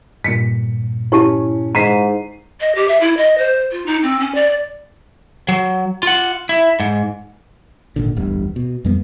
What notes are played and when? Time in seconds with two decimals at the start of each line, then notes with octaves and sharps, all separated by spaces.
0.24 G2 A#2 B6 C#7
1.12 C#4 E4 G4 A5
1.75 G#2 A#5 B6 C7 D#7
2.61 D#5
2.75 G4
2.88 E5
3.01 E4
3.17 D#5
3.38 C5
3.72 F4
3.86 D#4
4.03 C4
4.20 C#4
4.35 D5
5.48 F#3
6.03 F4 F#5
6.49 E4
6.80 G#2
7.96 G#1 A#2 D3
8.16 D1 A1 E2 G2
8.56 B2
8.85 F2 G3 A#3 B3